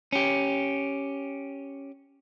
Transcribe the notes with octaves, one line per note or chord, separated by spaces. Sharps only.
C#4 G4